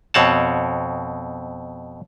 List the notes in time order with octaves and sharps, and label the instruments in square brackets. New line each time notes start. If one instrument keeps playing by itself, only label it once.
[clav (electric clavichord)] F2 B2 C4 C#5 F#5 A5